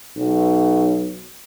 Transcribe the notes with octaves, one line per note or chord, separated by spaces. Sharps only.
B1